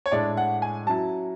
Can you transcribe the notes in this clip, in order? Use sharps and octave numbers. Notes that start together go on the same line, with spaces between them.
C#5
A2 G#3 D4 D5
F#5
G#5
F#3 C#4 E4 A5